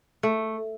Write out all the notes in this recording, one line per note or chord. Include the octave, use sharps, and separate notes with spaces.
A3